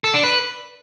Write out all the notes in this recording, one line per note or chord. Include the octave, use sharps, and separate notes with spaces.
A4
D4
B4